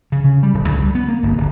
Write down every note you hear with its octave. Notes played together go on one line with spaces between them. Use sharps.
C#3
C#3
G3
D1
C#2
G3
B3
A#3
G1
D1